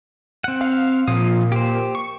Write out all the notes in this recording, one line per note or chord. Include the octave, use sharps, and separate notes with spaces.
C4 F#5
F5
A#2 F3 F5 D#6
G4 C5
C#6